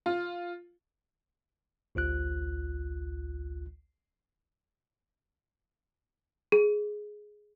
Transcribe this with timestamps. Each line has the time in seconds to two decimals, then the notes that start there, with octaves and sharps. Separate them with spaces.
0.06 F4
1.95 A1 D2 F4 F#6
6.52 G#4